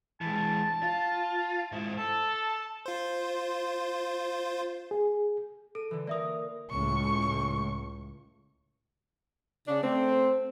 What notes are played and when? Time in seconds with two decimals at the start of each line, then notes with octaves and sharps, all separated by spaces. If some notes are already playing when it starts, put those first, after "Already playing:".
0.21 E3 G#3 A5
0.83 F4
1.72 G#2 E4
1.98 A4 A5
2.86 F4 C5
4.91 G#4
5.75 A4 D#7
5.91 D3 E3
6.07 A#3 A#4 D5 E5 D#6
6.70 C#2 A2 C#6
9.67 C#3 D4
9.82 A3 C4